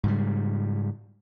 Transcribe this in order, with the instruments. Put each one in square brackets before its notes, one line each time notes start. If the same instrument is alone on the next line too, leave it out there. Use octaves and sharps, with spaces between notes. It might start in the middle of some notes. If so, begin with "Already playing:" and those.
[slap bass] G#2 C#3 G3